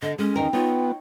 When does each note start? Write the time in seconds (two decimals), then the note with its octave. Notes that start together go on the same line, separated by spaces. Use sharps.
0.02 D3 D#5
0.18 G#3 C#4
0.36 E2 D#3 A#4 G5
0.53 B3 D#4 F4 C#5